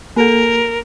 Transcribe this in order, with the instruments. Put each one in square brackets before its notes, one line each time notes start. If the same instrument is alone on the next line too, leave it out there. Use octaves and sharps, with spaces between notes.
[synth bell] A#3 A4 [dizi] A#4